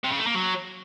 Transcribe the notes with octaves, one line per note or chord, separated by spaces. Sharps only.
C3
C#3
A3
A#3
F#3